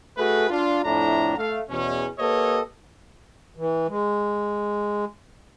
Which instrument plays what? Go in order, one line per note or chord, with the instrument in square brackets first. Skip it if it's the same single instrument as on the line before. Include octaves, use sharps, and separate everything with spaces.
[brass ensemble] A3 F#4 G#4 A4 B4
D4 F4
F2 A2 D4 E4 A#5
A3 F5
E2 B2 C#4
A#3 G4 A4 B4 C#5 D#5
[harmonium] E3
G#3